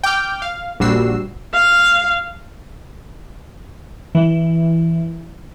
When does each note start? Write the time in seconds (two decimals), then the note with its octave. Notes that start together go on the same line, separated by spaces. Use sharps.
0.04 G5 D6 F6 G6
0.42 F5
0.80 A#1 G3 F#4 E6 C7
1.54 F5
4.15 E3